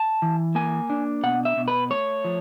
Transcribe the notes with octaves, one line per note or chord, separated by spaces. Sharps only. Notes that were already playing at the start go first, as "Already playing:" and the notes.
Already playing: A5
E3
A#3 G#5
D4
B2 F#5
E5
B2
B4
A3 C#5
F3